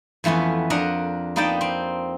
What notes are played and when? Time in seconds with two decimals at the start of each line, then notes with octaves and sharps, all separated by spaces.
0.24 F2 E3 A3 B3 C#4
0.70 F2 D4 A#4 D#5 F#5 A#5
1.36 A#3 B3 D#4 D5 G5 A5
1.61 C4